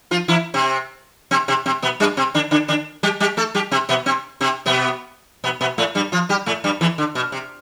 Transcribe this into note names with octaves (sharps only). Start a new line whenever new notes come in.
F3 F4
E3 E4
C3 C4
C3 C4
C3 C4
C3 C4
B2 B3
G2 G3
C3 C4
D3 D4
D3 D4
D3 D4
G3 G4
G3 G4
A3 A4
G3 G4
C3 C4
B2 B3
C3 C4
C3 C4
B2 B3
B2 B3
B2 B3
A2 A3
G2 G3
F3 F4
G3 G4
A2 A3
G2 G3
E2 E3
D3
B2
C3